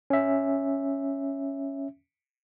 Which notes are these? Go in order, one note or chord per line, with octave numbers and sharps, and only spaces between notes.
C#4 E5